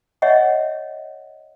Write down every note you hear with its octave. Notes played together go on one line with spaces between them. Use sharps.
C#5 D#5 E5 F#5